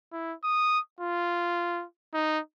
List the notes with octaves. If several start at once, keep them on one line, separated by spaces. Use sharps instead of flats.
E4
D#6
F4
D#4